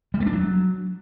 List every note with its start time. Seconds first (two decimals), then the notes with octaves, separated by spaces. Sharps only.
0.14 G3
0.20 A3
0.26 D4
0.33 F#3